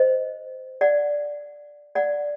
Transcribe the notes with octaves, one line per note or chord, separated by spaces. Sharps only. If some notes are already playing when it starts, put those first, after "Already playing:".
Already playing: C5 D#5
D5 F#5
D5 F#5